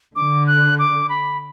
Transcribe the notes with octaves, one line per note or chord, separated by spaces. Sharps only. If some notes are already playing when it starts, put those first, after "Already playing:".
D3 D6
F#6
D6
B5